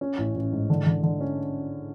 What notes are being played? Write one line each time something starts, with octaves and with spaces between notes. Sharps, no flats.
C#4
A1
A1
G#2
D3
D3
D3
C#4